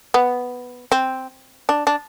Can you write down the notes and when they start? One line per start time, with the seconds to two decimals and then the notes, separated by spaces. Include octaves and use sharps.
0.14 B3
0.92 C4
1.69 D4
1.87 D4